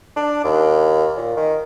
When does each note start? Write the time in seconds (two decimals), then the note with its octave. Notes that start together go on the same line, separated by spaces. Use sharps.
0.16 D4
0.44 D#2
1.17 A#2
1.37 D#3